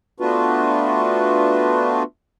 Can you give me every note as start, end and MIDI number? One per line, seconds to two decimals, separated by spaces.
0.20 2.03 57
0.20 2.03 59
0.20 2.03 62
0.20 2.03 65
0.20 2.03 66
0.20 2.03 71